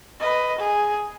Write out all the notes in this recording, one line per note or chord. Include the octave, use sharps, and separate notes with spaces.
B4 D#5
G#4